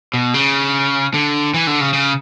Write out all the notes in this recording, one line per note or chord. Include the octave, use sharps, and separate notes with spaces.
B2
C#3
D3
E3
D3
C#3
C#3